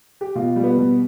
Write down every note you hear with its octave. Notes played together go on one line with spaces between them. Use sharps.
G4
B2 F4
G3
B3
B2